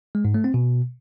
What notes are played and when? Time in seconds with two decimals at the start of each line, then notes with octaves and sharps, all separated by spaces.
0.15 G#3
0.25 G#2
0.34 A3
0.44 C4
0.54 B2